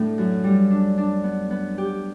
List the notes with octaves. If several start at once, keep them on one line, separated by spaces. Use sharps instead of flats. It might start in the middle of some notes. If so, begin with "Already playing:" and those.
Already playing: A2 A3 D4
F#2
G3
D4
D4
B3
B3
G4